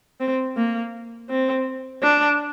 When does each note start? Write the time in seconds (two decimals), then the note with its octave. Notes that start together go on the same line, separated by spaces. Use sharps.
0.21 C4
0.56 A#3
1.29 C4
2.03 D4